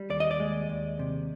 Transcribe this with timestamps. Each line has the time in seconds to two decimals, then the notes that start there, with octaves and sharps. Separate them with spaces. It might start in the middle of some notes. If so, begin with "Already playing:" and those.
Already playing: G3
0.10 D#2 D5
0.20 D#5
0.31 D5
0.40 G#3
0.69 D#2
0.99 C3